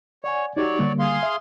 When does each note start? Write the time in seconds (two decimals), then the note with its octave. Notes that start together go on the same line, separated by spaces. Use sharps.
0.24 C#5 D5 F#5 G#5
0.57 F#3 D#4 F#4 G4 C#5 D5
0.79 D3 G3 A#3
0.99 G#4 F5 C6
1.23 E5